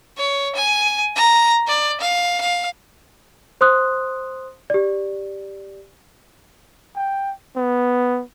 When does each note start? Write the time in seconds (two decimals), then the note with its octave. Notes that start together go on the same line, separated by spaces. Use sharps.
0.18 C#5
0.56 G#5
1.16 A#5
1.67 D5
2.01 F5
2.41 F5
3.61 C5 C6 D#6 F#6
4.70 G4 D5
6.96 G5
7.56 B3